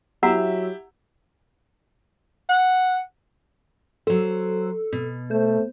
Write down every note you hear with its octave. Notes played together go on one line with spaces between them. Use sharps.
F#3 E4 G4 E5 F#5 A#5
F#5
F#3 A4 C5
B2
A3 C5